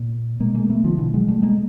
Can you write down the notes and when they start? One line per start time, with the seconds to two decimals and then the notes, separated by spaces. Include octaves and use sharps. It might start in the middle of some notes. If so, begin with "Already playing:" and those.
Already playing: A#2
0.40 B2 G#3 A#3
0.55 G#3 A#3
0.69 A3 B3
0.84 D#3 F3
0.98 B2 D3 E3
1.14 F#3 G#3
1.28 G3 A3
1.43 G#3 A#3